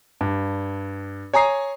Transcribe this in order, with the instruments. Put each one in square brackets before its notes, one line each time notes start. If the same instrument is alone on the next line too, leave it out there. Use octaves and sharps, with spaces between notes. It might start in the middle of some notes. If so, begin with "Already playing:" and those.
[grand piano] G2
C#5 G#5 A#5 D#6 C7